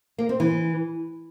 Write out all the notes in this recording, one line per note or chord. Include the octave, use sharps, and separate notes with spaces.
A#3
C4
E3